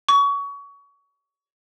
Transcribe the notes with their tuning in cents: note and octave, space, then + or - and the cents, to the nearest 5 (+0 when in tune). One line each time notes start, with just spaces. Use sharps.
C#6 +25